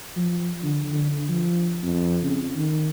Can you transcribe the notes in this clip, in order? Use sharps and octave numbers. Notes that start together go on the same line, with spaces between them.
F3
D3
D3
F3
F2
C#3
D#3